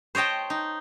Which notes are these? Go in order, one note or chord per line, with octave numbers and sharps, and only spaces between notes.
C5 C#5 D#5 G5 A5
D#4